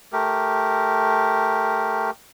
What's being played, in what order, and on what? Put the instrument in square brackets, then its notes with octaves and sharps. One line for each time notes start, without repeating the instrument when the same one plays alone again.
[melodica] A3 G4 A#4